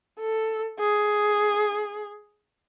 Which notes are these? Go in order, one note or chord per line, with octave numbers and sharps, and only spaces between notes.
A4
G#4